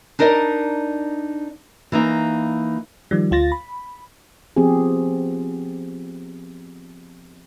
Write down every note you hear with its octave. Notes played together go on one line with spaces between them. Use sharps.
D4 D#4 A#4 D5 D#5
E3 A#3 D#4
D#3 F3 G3
D2 F4 A6 A#6
B5
F3 B3 C4 G4 G#4